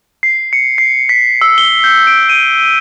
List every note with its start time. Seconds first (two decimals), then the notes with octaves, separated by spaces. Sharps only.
0.23 C7
0.53 C#7
0.78 C7
1.09 B6
1.41 E6
1.58 G7
1.84 G6
2.07 D7
2.29 D#7